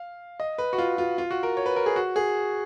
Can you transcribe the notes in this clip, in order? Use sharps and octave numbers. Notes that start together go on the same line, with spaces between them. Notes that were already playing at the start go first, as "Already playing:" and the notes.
Already playing: F5
D#5
B4
F#4
F4
F4
F4
F#4
A#4
C#5
B4
A#4
G#4
F#4
G#4